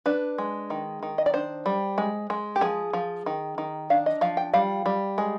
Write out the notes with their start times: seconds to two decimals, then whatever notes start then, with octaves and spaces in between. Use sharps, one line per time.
0.06 D4 B4
0.38 G#3
0.70 D#3
1.03 D#3
1.18 D#5
1.26 D5
1.34 D4 C5
1.66 G3
1.98 G#3
2.30 G#3
2.56 G4
2.61 F3 G#4
2.93 F3
3.26 D#3
3.58 D#3
3.90 D4 F5
4.06 D#5
4.21 F3 F5
4.37 G5
4.53 G3 F5
4.86 G3
5.18 G#3